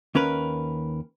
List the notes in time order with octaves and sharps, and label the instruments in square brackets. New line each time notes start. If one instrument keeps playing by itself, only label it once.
[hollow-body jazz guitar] D#2 C#4 A#4 B4